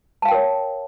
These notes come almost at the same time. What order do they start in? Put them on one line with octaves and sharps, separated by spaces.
A5 F5 G5 A#4 C#5